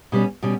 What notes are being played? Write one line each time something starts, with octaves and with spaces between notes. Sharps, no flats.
B2 G3 C#4
B2 G3 C#4